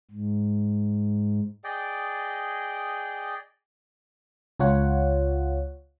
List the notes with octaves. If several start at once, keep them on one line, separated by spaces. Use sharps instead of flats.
G#2
G#4 D5 D#5 G5
C#2 F4 C#5 F#5